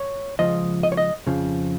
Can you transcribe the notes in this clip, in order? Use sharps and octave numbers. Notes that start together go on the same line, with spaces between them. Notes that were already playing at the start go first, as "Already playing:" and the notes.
Already playing: C#5
C#2 C#3 F3 D#5
D#5
C#5
D#5
F2 C#3 F3